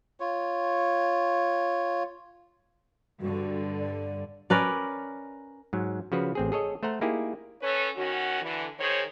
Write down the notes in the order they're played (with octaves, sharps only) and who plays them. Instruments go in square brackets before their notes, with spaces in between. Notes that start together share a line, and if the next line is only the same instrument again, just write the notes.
[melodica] F4 C#5
[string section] G2 D3 [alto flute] F#4
[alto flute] D5
[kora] C#4 A#4 B4 D5
[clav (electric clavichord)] G#2 F#3
C#3 F3 F#4 B4
A1 C4 G#4
G#4 A4 C#5 D#5
A3 C5 F#5 A#5
A#3 D#4 E4 G4 G#4
[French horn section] C#4 A4 B4 C#5
D#3 C#4 F#4
D3 E3
D#3 G#4 C5 C#5